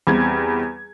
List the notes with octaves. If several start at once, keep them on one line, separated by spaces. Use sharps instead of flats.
E2 G3 C4 G#6